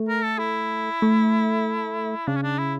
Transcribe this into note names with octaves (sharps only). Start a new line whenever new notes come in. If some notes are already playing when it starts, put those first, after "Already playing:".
Already playing: A3
A#4
A4
E4
A3
C#3 D4
C#4
D4
E4